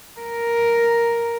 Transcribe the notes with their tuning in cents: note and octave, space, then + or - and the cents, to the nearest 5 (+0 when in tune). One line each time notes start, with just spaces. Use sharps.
A#4 +5